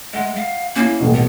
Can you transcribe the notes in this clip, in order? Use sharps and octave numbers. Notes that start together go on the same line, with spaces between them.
G#3 E5 F#5
F5
A#3 C#4 E4
D#1 A1 B2
B3